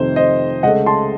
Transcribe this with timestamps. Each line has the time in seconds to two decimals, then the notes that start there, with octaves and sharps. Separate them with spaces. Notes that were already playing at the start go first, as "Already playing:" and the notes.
Already playing: F2 C3 D#3 A3 C5
0.16 C5 D#5
0.63 C#2 C#3 A3 D#5 F#5
0.86 A5 C6